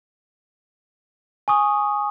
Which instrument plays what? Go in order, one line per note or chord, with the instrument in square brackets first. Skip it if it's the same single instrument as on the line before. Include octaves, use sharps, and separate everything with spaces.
[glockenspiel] G#5 C#6 D#6